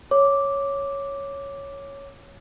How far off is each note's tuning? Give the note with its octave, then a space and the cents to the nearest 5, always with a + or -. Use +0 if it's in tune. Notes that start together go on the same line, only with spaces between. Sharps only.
C#5 +0 D6 -5